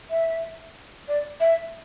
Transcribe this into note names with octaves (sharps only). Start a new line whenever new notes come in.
E5
D5
E5